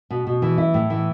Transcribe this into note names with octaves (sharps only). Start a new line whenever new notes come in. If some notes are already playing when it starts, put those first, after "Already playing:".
B2
B2
E3
E4
A2
E3